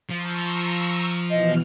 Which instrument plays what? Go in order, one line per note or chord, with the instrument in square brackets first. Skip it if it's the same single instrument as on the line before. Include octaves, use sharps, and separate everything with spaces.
[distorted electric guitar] F3 [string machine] A#5 C#6 E6
[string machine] B2 E3 F6 [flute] D#5